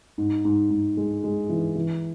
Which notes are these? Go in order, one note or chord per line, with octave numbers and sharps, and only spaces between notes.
G#2
G#2
G#2
G#3
G#3
E3
E3